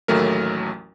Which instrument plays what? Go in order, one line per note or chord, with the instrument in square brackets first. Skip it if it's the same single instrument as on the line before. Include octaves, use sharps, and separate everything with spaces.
[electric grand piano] A1 D#2 F#3 A3 A#4